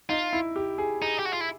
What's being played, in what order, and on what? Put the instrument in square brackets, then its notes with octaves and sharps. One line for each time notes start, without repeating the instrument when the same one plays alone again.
[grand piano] D#4 [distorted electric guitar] F4
[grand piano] E4
G4
G#4
[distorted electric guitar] D#4 [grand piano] G#4
[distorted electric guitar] G4
F#4
F4
E4